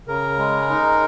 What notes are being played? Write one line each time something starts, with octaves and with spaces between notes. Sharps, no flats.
C#3 A#4
G#3
D#4